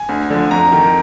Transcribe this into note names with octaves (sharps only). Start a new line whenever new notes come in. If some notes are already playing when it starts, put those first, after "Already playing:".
Already playing: G#5
D2
D3 F3
F2 A#5
D#3